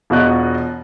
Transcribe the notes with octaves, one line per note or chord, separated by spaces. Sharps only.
E1 B2 F4 F#4 D#5 F#6